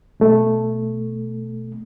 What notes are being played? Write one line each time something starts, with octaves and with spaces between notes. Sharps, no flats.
B2 A3